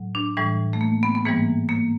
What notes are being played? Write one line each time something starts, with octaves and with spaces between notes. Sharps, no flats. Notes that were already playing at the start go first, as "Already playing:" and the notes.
Already playing: A2 F#3
D4
A2 E3 G3
A3
A#3
B3
B3
G#2 E3 G3 A#3
A#3